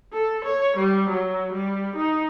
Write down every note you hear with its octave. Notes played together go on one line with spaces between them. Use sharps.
A4
C#5
G3
F#3
G3
D#4